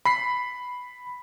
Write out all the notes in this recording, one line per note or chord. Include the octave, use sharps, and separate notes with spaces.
B5 B6 C7